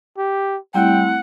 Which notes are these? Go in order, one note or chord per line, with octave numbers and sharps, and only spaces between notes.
G4
G3 A3 C4 E4 F#5 G5